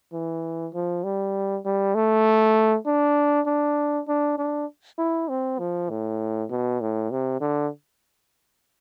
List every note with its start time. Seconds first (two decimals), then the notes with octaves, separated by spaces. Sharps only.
0.13 E3
0.74 F3
1.04 G3
1.65 G3
1.95 A3
2.86 D4
3.46 D4
4.08 D4
4.38 D4
4.98 E4
5.29 C4
5.59 F3
5.89 A2
6.50 B2
6.81 A2
7.11 C3
7.40 D3